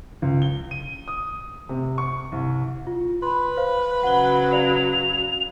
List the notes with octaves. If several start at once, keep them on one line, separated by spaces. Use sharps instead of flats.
C#2
G7
D#7
D#6
C3
C#6
C2
F4
B4 B5 C6
C5 F5
C#3 F#3 F#5 G7
D5 F5 F7